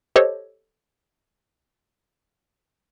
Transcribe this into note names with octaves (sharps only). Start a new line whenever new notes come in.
G4 A4 C5 C#5 D#5